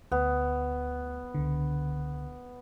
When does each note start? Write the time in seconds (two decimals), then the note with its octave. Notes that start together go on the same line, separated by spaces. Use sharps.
0.12 D2 B3
1.34 C#2 D3